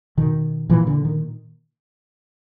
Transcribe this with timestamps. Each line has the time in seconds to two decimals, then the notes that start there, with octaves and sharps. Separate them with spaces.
0.17 B2 D#3
0.69 A#2 E3
0.87 D3
1.05 D#3